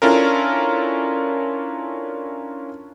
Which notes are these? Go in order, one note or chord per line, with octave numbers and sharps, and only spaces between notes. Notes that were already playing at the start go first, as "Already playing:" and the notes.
C#4 D4 E4 F4 A4 A#4